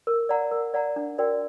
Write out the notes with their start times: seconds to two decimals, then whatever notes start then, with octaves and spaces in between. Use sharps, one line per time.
0.07 A#4
0.29 D5 F#5 A#5
0.51 A#4
0.74 D5 F#5 A#5
0.96 D4
1.18 F#4 A#4 D5 G5